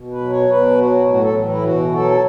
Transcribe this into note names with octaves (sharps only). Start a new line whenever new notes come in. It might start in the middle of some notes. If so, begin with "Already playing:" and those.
Already playing: B2
B4
F#3
C#5
B2 B4
F#3 F#4
A2 F#4
A4
E3
E4
B2 F#4
F#3 A4